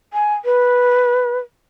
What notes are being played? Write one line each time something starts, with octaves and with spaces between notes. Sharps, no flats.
G#5
B4